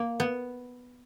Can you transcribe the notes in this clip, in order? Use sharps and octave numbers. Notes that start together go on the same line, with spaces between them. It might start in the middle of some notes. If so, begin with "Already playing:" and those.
Already playing: A#3
B3